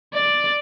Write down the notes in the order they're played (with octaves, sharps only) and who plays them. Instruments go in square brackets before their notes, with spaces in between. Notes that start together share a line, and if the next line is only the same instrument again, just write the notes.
[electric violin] D5